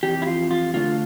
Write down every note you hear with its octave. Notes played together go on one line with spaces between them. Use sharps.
F2 E3 G4
E4
F4
F4
D3 A3 D4 F4